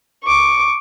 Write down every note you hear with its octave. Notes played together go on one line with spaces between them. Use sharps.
C#6 D6